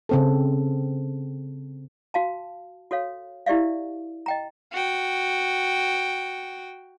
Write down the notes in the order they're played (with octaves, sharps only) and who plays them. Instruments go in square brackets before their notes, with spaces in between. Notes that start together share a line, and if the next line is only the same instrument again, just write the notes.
[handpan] C#3 C4 A4
[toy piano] F#4 F5 A5
F#4 A4 C#5 F5
E4 G4 D5 E5 F5
D#5 G5 A#5
[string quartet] F#4 G5